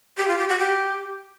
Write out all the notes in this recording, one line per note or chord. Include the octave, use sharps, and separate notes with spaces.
G4
F4
G4
F#4
G4